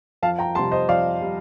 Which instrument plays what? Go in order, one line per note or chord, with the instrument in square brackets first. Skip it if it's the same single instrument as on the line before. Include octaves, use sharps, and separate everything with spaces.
[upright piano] F2 F5 A5
G5 A#5
C3 G3 A5 C6
C5 D#5
F2 D5 F5
G3